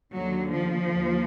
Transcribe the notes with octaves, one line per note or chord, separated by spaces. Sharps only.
D#2 D3 F#3
F3
D#2